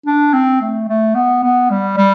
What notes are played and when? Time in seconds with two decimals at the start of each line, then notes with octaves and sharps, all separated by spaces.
0.06 D4
0.33 C4
0.61 A3
0.89 A3
1.15 B3
1.43 B3
1.71 G3
1.97 G3